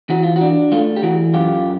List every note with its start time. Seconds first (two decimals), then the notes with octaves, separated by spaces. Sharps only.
0.10 E3 F#4
0.23 F4
0.36 F#4
0.41 D4
0.72 A3 F4
0.96 G4
1.03 E3 F#4
1.34 F#2 F4 G4